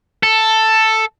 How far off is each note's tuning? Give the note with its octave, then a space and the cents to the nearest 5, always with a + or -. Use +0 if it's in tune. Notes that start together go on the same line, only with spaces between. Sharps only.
A4 +5